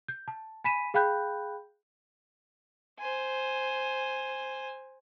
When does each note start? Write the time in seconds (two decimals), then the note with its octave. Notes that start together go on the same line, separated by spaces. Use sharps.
0.08 G6
0.28 A5
0.64 G#5 B5 B6 D#7 E7
0.94 G#4 F5 G5 B5 F#6 G6
2.99 C5 G#5